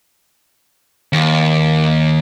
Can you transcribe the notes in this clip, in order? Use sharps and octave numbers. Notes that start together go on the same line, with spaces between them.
D#2